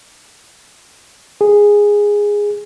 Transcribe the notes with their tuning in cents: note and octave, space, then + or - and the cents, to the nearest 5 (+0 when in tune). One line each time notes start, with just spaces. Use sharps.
G#4 -10